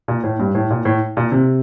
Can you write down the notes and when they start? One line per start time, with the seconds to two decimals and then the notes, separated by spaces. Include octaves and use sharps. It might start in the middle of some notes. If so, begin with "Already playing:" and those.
0.08 A#2
0.24 A2
0.39 G2
0.55 A2
0.70 A#2
0.85 A2
1.17 A#2
1.32 C3